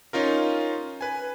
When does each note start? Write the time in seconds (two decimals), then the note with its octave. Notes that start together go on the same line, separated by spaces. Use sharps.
0.13 C#4 D#4 F4 A#4
1.01 B4 G#5